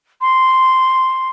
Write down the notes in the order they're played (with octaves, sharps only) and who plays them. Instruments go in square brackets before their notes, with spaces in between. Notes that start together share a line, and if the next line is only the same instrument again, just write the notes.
[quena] C6